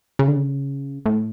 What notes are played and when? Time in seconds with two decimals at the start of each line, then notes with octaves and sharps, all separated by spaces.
0.19 C#3
0.28 D3
0.36 C#3
1.06 A2